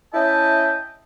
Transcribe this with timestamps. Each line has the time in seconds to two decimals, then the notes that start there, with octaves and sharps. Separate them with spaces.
0.14 C#4 E4 D#5 E5 G5 A5